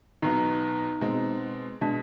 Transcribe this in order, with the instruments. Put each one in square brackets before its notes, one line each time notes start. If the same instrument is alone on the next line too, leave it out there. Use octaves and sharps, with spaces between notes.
[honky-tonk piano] B1 B2 B3 [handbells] D#4
[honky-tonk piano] B2 G#3 C4
[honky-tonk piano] B2 G#3 [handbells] D4